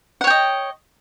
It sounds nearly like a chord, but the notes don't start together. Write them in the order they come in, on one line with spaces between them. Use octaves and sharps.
F#5 C#5 G5 D#5